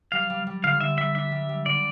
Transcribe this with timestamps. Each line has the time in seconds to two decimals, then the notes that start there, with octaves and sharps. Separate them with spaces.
0.12 G3 F5
0.30 G3
0.47 G3
0.63 D3 F5
0.80 D3 E5
0.98 G3 E5
1.15 D4 E5
1.32 G3
1.49 G3
1.66 D3 D5